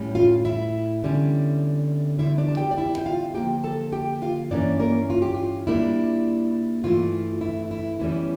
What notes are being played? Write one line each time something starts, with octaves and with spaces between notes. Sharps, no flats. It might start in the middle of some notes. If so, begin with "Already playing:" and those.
Already playing: A2 G3 C#4
F4 F5
E4 E5
E2 D3 G3 C#4
E2 D3 G3 E4 E5
D4 D5
A5
G4 G5
D5
E4 E5
G5
F4 F5
D3 F3 A#3 G4 G5
A4 A5
G4 G5
F4 F5
G2 E3 A#3 C#4 D4 D5
A#3 A#4
F4
G4
F4
A#2 G3 A#3 D4 E4
G2 E3 A3 F4
E4
E4
E2 E3 G3 C#4 E4